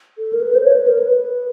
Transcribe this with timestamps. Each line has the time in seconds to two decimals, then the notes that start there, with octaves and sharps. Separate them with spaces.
0.18 A4
0.33 A#4
0.41 B4
0.55 C5
0.64 C#5
0.76 B4
0.88 A#4
0.99 B4